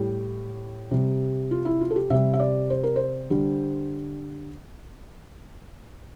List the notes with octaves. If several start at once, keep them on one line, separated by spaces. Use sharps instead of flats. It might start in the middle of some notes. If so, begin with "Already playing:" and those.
Already playing: A2 G3 G4
C3 G3
F4
E4
F4
A4
G4
C3 G3 E5
E5
D5
C5
A#4
C5
D3 G3